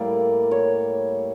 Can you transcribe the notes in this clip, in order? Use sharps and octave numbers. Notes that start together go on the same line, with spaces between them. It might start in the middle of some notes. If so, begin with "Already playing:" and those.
Already playing: A2 G3 A#3 D5
C#5